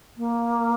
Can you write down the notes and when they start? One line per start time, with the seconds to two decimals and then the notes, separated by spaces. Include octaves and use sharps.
0.17 A#3